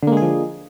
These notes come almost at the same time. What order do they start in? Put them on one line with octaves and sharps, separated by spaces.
D3 A#3 G#3 G#4 F3